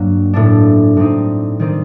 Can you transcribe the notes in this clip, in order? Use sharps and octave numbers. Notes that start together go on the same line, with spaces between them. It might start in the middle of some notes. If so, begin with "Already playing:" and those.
Already playing: G2 F#3 A#3
A2 A3 D4
A2 G3 C4 D#4
D#3 G3 C4 D#4